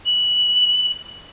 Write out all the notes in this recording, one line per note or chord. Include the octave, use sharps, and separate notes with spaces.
F#7